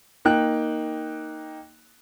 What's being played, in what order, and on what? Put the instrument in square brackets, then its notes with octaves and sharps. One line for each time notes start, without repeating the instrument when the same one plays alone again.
[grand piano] A#3 D#4 G5 F#6